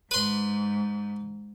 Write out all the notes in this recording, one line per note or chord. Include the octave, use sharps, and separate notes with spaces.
G#2 B4 C6